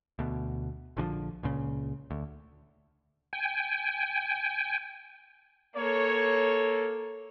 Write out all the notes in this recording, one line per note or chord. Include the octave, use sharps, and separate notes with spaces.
D2 B2
A#1 D3 E3 F3
C#2 A#2 C#3
D2
G5 G#5
A#3 A4 C#5